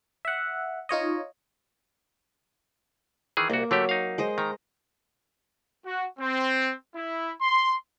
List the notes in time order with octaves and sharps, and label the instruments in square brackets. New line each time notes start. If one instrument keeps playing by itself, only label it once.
[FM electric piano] E5 F#5
D#4 F4 C#5 D#5
[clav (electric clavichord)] D#3 E3 G#4
[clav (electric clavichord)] C2 F#4 [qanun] A#3
[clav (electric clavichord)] D3 A3 G4 [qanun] F#3
[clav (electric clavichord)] D#4 F5
[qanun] G#3 C5 D#5
[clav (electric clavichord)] D#3 [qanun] A#5
[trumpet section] F#4
C4
E4
C6